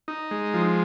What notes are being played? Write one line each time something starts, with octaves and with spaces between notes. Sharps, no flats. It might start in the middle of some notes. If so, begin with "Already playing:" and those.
D#4
G#3
F3